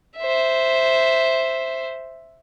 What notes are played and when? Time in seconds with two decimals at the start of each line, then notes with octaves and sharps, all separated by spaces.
0.18 C5 E5